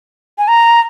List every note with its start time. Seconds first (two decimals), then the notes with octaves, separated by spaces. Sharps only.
0.38 G#5
0.48 A#5